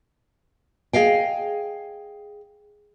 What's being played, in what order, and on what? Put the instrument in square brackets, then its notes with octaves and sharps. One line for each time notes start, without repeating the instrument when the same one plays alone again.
[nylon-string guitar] G#4 D#5 F5 G5